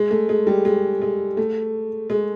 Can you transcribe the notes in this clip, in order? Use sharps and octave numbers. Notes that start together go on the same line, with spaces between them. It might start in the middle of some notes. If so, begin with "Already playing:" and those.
Already playing: G#3
A3
G#3
G3
G#3
G#3
A3
G#3